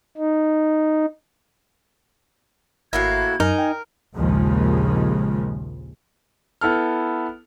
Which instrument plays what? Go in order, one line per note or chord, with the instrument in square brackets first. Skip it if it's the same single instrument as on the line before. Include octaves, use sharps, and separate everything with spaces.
[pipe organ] D#4
[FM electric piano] G#1 [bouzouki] A2 A#3 E4 [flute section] F#4 F#6 G#6
[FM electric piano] F#2 [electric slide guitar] D#4 [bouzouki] A#4 [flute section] G#5
[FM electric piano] G5
[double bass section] A#1 D#2 C#3 F3 G#3
[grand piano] B3 E4 A4 F6